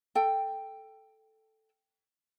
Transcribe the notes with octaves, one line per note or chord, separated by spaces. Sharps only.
A4 G5